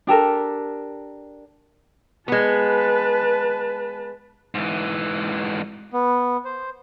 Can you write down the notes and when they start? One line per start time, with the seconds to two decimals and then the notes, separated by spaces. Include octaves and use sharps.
0.07 D4 G4 A4 A#4
2.28 G#3 B3 B4 A5
4.55 G#2 E3
5.93 B3
6.45 C5